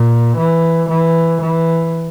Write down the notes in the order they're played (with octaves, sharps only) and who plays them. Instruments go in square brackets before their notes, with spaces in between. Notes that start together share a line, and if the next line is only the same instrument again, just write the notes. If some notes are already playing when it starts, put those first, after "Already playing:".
Already playing: [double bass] A#2
E3
E3
E3